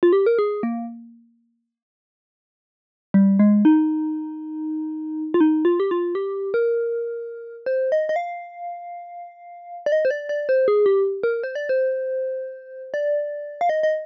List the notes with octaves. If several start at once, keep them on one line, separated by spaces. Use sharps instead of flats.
F4
G4
A#4
G#4
A#3
G3
G#3
D#4
F4
D#4
F4
G4
F4
G4
A#4
C5
D#5
D#5
F5
D5
D#5
C5
D5
D5
C5
G#4
G4
A#4
C5
D5
C5
D5
F5
D#5
D#5